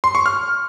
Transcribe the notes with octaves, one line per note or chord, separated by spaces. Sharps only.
C6
C#6
F6